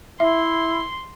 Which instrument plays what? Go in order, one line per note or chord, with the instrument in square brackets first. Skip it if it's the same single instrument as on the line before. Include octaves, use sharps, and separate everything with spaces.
[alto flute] E4 [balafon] E5 [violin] C6